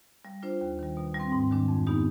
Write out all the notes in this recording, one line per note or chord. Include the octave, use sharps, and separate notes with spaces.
G3
D4 F4 C5
D#2
D#3 G3
B2
G3 C4
G#2
D#3 G#3 D4
F2
D#3 B3 D#4 G4